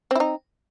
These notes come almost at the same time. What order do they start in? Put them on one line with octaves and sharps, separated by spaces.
C4 E4 D#4